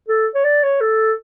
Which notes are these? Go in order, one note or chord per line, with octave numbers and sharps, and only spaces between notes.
A4
C#5
D5
C#5
A4